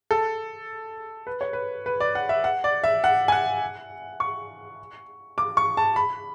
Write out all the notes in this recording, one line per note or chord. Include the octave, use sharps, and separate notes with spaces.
A4
B4
C#5
B4
B4
D5
F#5
E5
F#5
D5
E5
F#5
G#5
F#5
C#6
D6
C#6
A5
B5